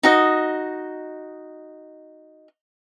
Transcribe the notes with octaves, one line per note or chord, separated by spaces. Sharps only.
D#4 F#4 D#5